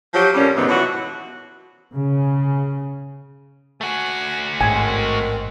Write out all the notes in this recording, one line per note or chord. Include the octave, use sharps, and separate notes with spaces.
F3 F#3 F#4 G4
F2 A#2 G3 C#4
F2 G#2 C3 D#3 B3
B2 E3 F#3 F4 F#4
C#3
A3 F#4 G#5
A1 G#2 D#3 G#3 C4 G#5